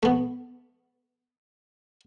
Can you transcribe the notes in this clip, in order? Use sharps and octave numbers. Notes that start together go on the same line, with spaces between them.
A3 B3